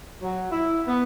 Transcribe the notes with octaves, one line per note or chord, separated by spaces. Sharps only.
F#3
E4
B3